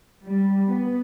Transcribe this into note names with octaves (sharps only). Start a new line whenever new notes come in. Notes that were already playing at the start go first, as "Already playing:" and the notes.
G3
B3